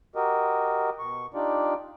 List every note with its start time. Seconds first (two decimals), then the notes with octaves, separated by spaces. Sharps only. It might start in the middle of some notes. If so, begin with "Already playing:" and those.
0.15 F#4 G4 A#4 D#5
0.99 B2 C#6
1.34 D4 D#4 F4 G4 D5